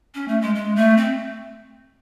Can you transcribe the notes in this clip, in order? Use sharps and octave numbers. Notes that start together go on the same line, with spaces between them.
C#4
A3
G#3
G#3
A3
C4